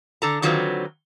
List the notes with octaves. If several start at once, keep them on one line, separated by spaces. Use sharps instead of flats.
D3 A4 A#5
D3 D#3 F#3 C4 F4 B4